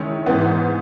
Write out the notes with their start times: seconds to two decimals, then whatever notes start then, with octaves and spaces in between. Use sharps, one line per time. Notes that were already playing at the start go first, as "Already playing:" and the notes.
Already playing: D#3 G#3 C#4 E4
0.26 G#2 E3 B3